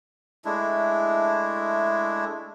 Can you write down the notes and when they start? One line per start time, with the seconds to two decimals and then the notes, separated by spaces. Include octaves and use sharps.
0.45 G#3 A3 D4 E4